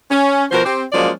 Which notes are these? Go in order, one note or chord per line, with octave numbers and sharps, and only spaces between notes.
C#4
B2 F3 F#4 A#4 C5
C4 G4
F3 F#3 G#3 A#3 C#4 D5